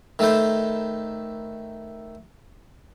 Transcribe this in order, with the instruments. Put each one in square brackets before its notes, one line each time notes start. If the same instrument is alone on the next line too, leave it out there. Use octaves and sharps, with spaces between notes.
[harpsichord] D#3 A3 A4 B4 C5